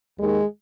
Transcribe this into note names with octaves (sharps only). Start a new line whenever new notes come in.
D#2 D#3 G#3